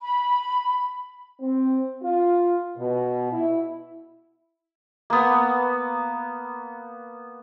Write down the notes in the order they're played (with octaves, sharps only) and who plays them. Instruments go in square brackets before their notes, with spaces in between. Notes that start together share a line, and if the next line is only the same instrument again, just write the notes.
[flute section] B5
[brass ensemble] C4
F4
B2
E4
[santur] A#3 B3